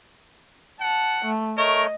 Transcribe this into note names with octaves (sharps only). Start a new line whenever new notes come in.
F#5 A5
A3
A3 A#4 C#5 D#5